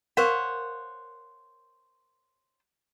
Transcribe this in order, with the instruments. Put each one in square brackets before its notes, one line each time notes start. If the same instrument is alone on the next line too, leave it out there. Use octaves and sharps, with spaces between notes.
[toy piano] A#4 F5 [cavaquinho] C5 C#5 F#5